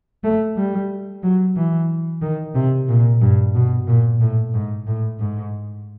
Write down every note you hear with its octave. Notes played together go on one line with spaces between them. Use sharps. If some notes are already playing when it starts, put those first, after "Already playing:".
A3
G3
F#3
E3
D#3
C3
A#2
G2
B2
A#2
A2
G#2
A2
G#2